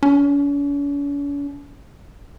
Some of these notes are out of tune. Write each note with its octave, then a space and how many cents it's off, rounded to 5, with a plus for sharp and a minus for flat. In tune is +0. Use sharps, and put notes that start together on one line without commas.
C#4 +45